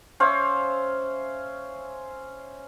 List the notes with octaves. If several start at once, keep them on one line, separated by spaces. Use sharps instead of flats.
C#4 C5 E5 F5